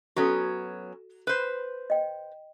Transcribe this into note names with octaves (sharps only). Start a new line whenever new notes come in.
F#3 B3 C#4 F#4 A4
B4 C5
D#5 G5